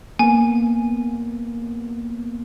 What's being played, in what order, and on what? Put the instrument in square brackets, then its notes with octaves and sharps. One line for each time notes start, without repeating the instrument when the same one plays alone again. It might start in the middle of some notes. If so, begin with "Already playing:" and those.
[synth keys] A#3 B3 [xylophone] G#5